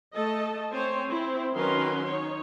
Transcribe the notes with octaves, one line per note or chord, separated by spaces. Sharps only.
A3 A4 D#5 A5
C4 C5 C#5 G#5
C4 E4
D#3 F#3 C#4 A#4 B4 C6
D#4 C#5